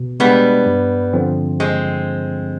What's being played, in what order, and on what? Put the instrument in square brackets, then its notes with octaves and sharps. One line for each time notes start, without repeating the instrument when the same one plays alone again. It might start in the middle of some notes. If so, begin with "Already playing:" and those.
Already playing: [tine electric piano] B2
[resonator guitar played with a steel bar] G3 B3 [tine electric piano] G#3 D4 G4
[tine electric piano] G2
D3 F3 C4
[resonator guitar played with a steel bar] G#3 C4